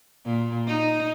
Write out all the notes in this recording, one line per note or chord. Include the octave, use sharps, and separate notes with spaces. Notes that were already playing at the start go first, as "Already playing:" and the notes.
A#2
D#4